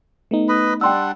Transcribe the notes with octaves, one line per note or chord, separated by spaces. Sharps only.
A3 B3 D#4
B4 D#5 B5
G3 D4 F#5 G5 C6 E6